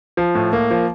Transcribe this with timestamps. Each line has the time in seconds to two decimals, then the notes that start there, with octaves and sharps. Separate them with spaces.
0.17 F3
0.35 A2
0.53 A#3
0.71 F3